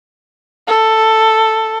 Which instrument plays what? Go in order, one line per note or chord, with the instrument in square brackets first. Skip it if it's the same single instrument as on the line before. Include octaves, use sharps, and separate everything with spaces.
[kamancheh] A4